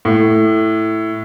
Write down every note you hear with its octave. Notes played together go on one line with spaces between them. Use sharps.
A2